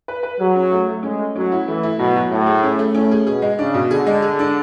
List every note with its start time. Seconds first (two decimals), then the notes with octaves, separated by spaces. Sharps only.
0.08 B4
0.23 B4
0.40 F#3 G#4
0.56 C#4
0.71 A3
0.88 A3
1.03 G#3 C#4
1.19 A3
1.36 F#3 C#4
1.52 E4
1.67 E3 A3
1.83 E4
1.99 B2 F#3
2.16 F#3
2.31 A2 A3
2.47 G#4
2.63 C#4
2.79 A3
2.94 A2 C#4
3.11 G#4
3.26 B2 G#4
3.42 G#3
3.59 C#3 D4
3.74 B2
3.90 D3 G#4
4.07 G#3
4.22 G#4
4.39 D4